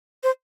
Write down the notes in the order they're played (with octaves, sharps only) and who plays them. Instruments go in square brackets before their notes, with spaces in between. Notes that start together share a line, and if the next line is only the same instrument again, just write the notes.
[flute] C5